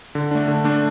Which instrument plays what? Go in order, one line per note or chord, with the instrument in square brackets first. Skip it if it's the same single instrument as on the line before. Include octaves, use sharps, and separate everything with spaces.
[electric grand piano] D3
A3 D4
D3
A3 D4